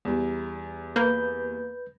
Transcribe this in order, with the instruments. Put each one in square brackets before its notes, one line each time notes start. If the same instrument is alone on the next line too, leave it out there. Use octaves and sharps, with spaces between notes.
[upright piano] E2 G3
[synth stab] A#3 [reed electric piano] B4 G6